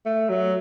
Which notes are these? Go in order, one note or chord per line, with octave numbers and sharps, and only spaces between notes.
A3
F#3